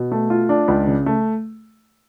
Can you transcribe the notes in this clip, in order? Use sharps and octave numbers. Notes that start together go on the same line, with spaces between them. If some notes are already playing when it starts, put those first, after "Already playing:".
Already playing: B2
A3
F4
D4
C#2
C#3
A3